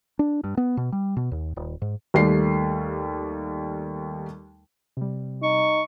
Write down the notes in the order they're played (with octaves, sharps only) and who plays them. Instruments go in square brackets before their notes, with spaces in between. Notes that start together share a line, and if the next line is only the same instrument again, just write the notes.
[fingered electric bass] D4
G2
B3
B2
G3
B2
D#2
D#1
G#2
[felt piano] D#2 G3 A3 C7
[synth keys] C3 G3
[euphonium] D#4 [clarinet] C#6